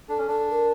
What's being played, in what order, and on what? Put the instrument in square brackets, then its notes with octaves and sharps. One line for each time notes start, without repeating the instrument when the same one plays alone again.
[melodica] D4 [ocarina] A4
[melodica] C#4
[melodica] D4 [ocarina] A4
[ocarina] A#4